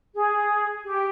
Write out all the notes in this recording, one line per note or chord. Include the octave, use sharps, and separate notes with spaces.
G#4
G4